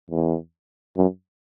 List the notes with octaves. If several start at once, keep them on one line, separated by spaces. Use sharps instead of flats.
E2
F#2